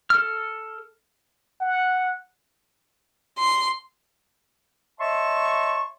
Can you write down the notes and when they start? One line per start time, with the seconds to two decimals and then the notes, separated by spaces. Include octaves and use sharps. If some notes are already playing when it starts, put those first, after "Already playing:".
0.10 A4 F6
1.61 F#5
3.39 C6
5.00 C#5 D#5 E5 A5 C6 C#6